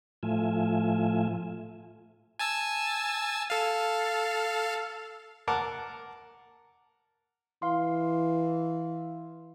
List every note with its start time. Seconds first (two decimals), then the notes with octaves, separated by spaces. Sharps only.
0.23 A2 F3 A3 F4 E5 G#5
2.39 G#5 A5 E6
3.50 A4 F5
5.48 A#4 F#5 A5 D6
7.62 E3 F5 C6